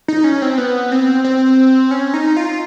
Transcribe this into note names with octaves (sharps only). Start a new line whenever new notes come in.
D#4
C#4
C4
B3
C4
C4
C#4
D#4
F4